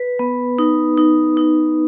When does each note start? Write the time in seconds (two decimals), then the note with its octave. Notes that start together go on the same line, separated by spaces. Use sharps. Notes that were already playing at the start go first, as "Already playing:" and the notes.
Already playing: B4
0.19 B3
0.59 D#4
0.98 D#4
1.37 D#4